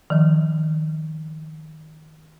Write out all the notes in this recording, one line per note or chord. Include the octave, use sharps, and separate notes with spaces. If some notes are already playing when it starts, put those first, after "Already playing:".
D#3 F3